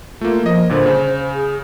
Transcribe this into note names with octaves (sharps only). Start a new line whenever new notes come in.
A3 A#3 F4
F3 A#3 D#5
G1 A#2 D3 C5
C#3
G#4